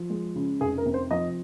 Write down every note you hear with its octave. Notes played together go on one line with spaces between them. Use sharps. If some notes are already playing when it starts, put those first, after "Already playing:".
Already playing: F3
G#3
C#3
F1 G#4
A#4
C3
C5
F3 D#5